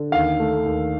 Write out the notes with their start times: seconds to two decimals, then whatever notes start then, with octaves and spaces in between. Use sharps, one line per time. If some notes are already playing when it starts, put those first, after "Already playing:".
Already playing: D3
0.12 D#2 F5
0.40 A3
0.65 D#2